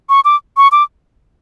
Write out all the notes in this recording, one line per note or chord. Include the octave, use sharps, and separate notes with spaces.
C#6
D6
C#6
D6